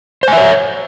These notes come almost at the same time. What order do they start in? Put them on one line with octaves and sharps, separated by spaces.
C5 G#5 E5 C#5